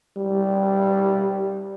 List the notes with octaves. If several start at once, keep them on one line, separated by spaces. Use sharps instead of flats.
G3